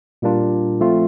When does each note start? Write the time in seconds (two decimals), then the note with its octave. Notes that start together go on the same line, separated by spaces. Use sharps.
0.22 A#2 G3 A#3 D4 F4
0.81 F3 A3 C4 F4